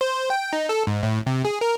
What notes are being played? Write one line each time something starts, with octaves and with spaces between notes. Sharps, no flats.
C5
G5
D#4
A4
G#2
A2
C3
G#4
A#4